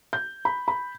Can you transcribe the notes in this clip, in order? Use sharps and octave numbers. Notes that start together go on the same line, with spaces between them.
G6
B5
B5